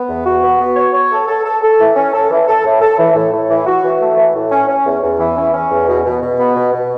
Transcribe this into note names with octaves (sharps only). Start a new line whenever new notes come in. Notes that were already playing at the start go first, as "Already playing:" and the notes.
Already playing: B3
E2
F#4
B3
B3
C#5
C#5
A4
A4
A4
A4
E3
C#4
A4
E3
A4
A2
A4
E3
A2
A2
E3
F#4
E3
A3
E3
A2
C#4
C#4
E2
E2
E3
C#4
C#4
E2
B2
B2
B2
B3
B2
B2